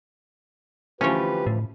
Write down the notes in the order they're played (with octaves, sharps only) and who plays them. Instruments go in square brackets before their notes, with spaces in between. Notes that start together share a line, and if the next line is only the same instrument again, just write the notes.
[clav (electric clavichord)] D2 E3 F3 [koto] C#4 C#5 [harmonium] G4 B4
[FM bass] A2